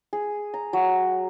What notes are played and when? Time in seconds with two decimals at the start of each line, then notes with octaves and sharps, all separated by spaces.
0.13 G#4
0.54 A#5
0.73 F#3